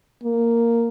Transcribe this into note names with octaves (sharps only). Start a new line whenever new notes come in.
A#3